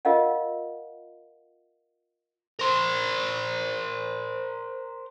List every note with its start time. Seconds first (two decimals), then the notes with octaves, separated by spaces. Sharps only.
0.05 F4 A#4 D#5 F5 F#5
2.60 A#4 C5